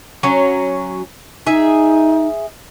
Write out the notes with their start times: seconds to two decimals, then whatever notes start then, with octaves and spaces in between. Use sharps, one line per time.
0.23 F#3 C#4
1.47 D#4 G#4 E5